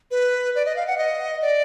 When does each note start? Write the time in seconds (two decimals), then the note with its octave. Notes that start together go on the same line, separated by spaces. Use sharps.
0.11 B4
0.55 D5
0.66 D#5
0.76 F5
0.87 F#5
0.98 D#5
1.42 D5